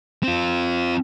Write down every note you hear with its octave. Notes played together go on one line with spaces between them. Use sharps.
C4 F4